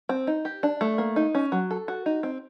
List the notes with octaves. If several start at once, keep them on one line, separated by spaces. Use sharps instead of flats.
C4
D#4
G4
D4
A3
A#3
D#4
C#4
F#3
A4
F#4
D#4
C4